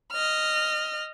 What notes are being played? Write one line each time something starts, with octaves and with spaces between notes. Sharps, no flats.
D#5 F6